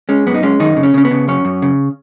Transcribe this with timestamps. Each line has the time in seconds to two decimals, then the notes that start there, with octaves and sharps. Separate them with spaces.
0.09 G#3 C#4
0.27 F#2 B3
0.35 D#4
0.43 G#3 C#4
0.60 F#2 D#3 D#4
0.76 C#3
0.83 C#4
0.94 C#3 C#4
1.05 B3
1.11 C#3
1.28 F#2 C#4
1.45 F#2
1.62 C#3